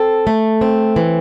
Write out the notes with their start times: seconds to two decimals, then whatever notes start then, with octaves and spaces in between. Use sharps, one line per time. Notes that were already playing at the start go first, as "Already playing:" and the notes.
Already playing: C4 A4
0.27 A3
0.61 C4
0.96 E3